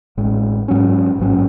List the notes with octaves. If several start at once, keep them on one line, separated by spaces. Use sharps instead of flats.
A1 A2 G#3
G#2 F#3 C#4
A1 G#2 F#3 C#4